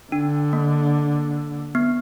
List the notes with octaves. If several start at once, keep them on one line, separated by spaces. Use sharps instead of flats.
D3 D4
A#3
B3